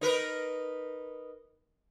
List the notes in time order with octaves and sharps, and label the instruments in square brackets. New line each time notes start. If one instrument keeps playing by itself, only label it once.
[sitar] D#4 A#4 B4